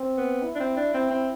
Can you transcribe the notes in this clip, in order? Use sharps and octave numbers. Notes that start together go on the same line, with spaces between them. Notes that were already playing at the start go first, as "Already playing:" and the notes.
Already playing: C4
B3
E4
D4
C4
D4
C4
C4